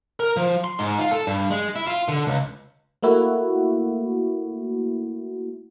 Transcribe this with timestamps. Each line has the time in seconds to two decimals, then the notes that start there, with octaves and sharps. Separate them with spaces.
0.20 A#4
0.37 F3
0.64 C6
0.79 G#2
0.99 F4
1.11 A4
1.27 G2
1.50 G#3
1.76 E4
1.87 F4
2.08 D3
2.27 C#2
3.03 A3 A#3 E4 F#4